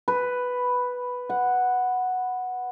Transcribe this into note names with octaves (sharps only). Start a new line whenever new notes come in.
B4
F#5